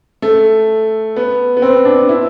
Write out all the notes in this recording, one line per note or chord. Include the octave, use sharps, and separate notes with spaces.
A3
B3
B3
C4
D4
E4